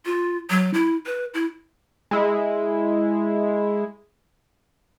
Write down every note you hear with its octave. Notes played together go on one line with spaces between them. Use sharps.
F4
F#3
E4
B4
E4
G#3 E4